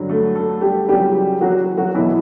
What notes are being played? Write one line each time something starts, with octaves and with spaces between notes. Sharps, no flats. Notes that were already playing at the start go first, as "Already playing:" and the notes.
Already playing: G2 D3 F#3
A3 A4
A3 A4
G3 G4
E2 C#3 F#3 G3 G4
F#3 F#4
F#3 F#4
E2 B2 E3 F#3 E4